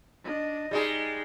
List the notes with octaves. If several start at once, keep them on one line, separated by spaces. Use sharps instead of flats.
D4 D#5
G3 G#3 D#4 G#4